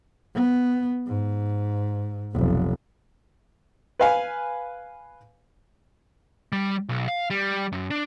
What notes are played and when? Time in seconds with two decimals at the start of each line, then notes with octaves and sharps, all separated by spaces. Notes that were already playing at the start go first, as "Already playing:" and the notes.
0.35 B3
1.07 G#2
2.33 F1 B1
3.99 B4 F5 G#5
6.52 G3
6.89 B1
7.08 F5
7.30 G3
7.72 F#2
7.91 D4